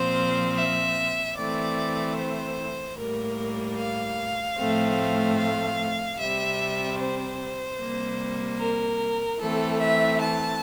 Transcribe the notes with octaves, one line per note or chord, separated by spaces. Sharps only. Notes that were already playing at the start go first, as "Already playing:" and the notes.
Already playing: A#2 F3 C4 C5
E5
E3 A3 C4 D5
C5
A2 G3 A#3 A#4
F5
A2 F3 A3 C4
F5
C3 G3 C4 E5
C5
C3 G3 A#3
A#4
E3 A3 C4 A4
E5
A5